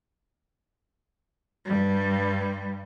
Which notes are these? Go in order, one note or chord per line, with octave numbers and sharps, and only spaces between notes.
G2 G3